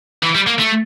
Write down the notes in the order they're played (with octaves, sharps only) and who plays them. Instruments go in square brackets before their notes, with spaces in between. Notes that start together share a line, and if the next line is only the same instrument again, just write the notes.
[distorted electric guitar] E3
G3
A#3
A3